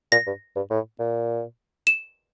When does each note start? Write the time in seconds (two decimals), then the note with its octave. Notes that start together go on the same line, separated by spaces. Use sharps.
0.12 A#2 A#6
0.27 G2
0.56 G2
0.70 A2
0.99 A#2
1.87 E7